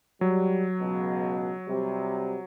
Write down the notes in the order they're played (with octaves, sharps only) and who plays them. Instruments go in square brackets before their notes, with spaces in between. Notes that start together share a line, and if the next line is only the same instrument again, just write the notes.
[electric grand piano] F#3 [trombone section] G3
[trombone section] C#2 B2
C3 G3